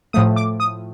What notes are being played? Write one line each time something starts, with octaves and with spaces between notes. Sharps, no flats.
A2 F3 A3 D#6
D6
D#6